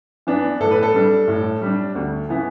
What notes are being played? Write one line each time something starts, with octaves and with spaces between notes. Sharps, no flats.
E3 B3 D4
A2 A4
B4
A4
G3 D4
A2
G3 D4
D2
C#3 E3 B3 E4